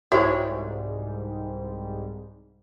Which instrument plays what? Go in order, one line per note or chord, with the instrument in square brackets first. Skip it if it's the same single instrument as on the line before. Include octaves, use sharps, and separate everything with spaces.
[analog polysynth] C2 G#2 G3 [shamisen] E4 C#5 [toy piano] F#4 C5